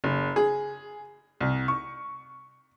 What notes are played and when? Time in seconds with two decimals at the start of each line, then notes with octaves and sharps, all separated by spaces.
0.04 F#1
0.36 G#4
1.41 C2
1.68 C#6